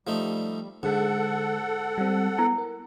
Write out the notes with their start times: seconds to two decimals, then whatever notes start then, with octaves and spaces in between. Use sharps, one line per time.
0.07 F3 G3 A3 D#4
0.83 G#2 D3 G#3 A4 F#5
1.98 G3 C4
2.39 B3 E4
2.58 A#4